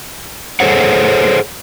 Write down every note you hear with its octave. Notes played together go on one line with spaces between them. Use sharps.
G#4 A4 C5 C#5 F#5